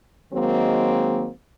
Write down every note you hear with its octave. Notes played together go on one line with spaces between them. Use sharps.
D#3 F#3 G#3 A#3 C4